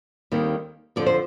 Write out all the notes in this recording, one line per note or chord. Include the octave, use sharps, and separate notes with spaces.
D#2 D#3 G3 C4
F2 D3 F3 D5
C5